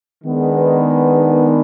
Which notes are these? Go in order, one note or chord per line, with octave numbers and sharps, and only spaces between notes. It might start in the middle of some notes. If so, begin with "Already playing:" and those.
D#3 G#3 B3 D4